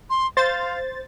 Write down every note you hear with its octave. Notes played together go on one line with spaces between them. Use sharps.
C6
C5 F5 A6